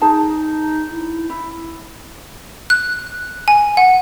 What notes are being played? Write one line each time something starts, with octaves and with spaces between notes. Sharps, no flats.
D#4 G#4 A5
E4
E4
F#6
G#5
F#5